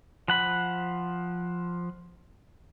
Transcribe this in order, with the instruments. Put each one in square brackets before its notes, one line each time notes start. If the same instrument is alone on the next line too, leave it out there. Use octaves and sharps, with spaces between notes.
[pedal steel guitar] F3 F#5 B5